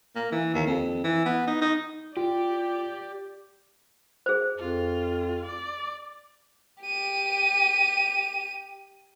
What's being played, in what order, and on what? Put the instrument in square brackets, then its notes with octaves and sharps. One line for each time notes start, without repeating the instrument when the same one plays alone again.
[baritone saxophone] A#3
E3
D#2
F2
E3
B3
D#4
D#4
[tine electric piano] F4 [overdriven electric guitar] G4 [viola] D5
[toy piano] G#4 C5
[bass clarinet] F2 [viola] F4
[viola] D5
[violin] G4 D#7